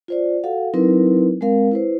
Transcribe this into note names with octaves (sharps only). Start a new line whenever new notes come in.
F4 C5 D5
F#4 A4 F5 F#5
F#3 C4 D#4 E4 A#4 B4
G#3 C4 A#4 F5
E4 B4 C5